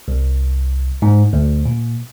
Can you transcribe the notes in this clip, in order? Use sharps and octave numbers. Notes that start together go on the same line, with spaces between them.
C2
G#2
D2
A#2